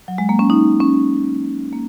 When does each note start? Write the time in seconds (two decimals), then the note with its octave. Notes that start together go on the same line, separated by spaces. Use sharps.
0.08 F#3
0.18 G#3
0.29 A#3
0.39 C#4
0.50 D#4
0.80 C#4
1.73 A#3